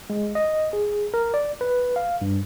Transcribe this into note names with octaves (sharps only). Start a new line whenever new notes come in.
G#3
D#5
G#4
A#4
D5
B4
F5
G2